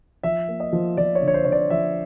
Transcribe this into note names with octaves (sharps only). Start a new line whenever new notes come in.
F3 E5
A#3
D#5
F3
F3 D5
C#5
D3
C#5
C5
D3 C#5
D5
F3 E5